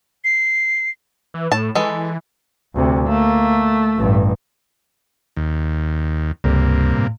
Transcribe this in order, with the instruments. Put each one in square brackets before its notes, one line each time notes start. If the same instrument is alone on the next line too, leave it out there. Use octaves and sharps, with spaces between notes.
[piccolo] C7
[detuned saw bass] E3
[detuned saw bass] A2 [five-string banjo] A5
[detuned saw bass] E3 [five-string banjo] G#3 A4
[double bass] D2 C3
[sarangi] A3 [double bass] A#3
[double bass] A1 G2
[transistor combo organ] D#2
[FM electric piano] C#2 [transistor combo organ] G2 C3 A#3
[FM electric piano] A2